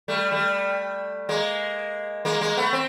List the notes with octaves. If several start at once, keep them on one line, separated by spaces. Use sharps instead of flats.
G3 A3
G3 A3
G#3 A#3
G#3 A#3
G#3 A#3
A3 B3
C4